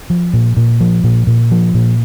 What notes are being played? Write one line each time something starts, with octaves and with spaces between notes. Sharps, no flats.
F3
A#2
A#2
F3
A#2
A#2
F3
A#2